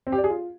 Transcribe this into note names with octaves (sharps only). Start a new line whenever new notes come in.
C4
G4
D5
G#4
F4